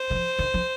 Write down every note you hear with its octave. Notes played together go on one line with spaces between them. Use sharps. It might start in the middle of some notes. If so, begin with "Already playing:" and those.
Already playing: C5
D#3
F3
D#3
F3